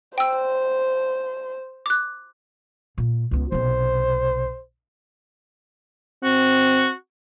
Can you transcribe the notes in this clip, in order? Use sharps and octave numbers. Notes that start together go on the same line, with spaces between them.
C5 G5 E6
D6 F#6
A#2
C#2 B3
B1 C3 C5
C4 F#4